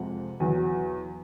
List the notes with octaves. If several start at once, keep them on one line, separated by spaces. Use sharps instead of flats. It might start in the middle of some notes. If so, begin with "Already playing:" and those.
Already playing: F2 C3 F3 G#3 F#5
E2 B2 F#3